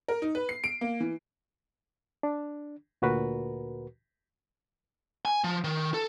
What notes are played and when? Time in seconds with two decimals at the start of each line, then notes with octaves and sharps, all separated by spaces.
0.08 A#4
0.22 D#4
0.35 B4
0.49 C7
0.64 D7
0.81 A#3
1.00 E3
2.23 D4
3.02 D2 A#2 F#4 A#4 B4
5.25 G#5
5.44 F3
5.64 D#3
5.94 A4